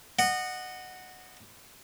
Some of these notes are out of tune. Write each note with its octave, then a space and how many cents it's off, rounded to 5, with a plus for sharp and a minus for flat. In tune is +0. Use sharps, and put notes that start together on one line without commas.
D#5 -25 F#5 +0